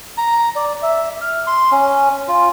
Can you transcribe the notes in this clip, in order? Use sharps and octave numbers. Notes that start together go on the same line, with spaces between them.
A#5
D5
E5
F6
C6
C#4
F4